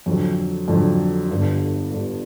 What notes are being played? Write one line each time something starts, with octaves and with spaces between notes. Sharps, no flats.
F2 D3 F#3
F2 D3 F#3
G1 G2 D3
G1 G2 D3